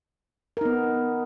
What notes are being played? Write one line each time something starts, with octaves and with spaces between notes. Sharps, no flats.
B3 D#4 A#4